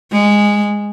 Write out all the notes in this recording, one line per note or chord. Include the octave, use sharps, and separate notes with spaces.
G#3